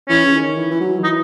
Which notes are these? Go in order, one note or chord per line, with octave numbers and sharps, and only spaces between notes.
E3 C#4
C#3
D#3
E3
E3
F#3
D#3
E3 D#4